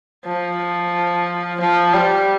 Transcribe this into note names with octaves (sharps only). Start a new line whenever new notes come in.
F3
F3
G3